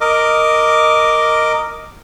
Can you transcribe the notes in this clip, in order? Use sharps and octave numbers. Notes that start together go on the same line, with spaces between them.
A#4 D#5 D6